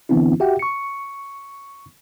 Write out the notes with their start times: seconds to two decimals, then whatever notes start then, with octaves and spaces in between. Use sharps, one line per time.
0.09 D3 E3 B3 C4 D4 E4
0.40 F#4 G4 E5 F#5 G5
0.59 C#6 C#7